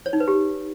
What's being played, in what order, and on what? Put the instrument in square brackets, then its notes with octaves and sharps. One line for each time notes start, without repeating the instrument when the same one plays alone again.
[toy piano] C#5
D#4
B4
G4